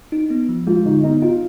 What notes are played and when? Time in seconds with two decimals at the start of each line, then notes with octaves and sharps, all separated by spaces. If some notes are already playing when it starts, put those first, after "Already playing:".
0.12 D#4
0.30 B3
0.49 F3
0.67 G#3 F4
0.86 D3 D#4
1.04 B3 D#4
1.22 D#4 F4